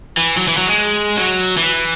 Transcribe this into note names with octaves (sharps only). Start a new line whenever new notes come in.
E3
F#3
E3
F#3
G#3
F#3
E3